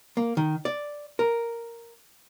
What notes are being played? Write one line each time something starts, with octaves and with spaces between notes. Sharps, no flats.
A#3
D#3
D5
A#4